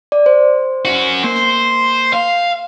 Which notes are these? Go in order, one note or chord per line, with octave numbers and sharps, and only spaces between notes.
D5
C5
C#4 F#4
A#3 C5
F5